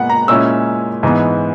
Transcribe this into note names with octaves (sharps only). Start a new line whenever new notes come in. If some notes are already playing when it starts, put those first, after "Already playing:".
Already playing: A#2 G#3 B3 F#5
A#5
A#2 G#3 C#4 E4 E6
G#2 E3 G#3 B3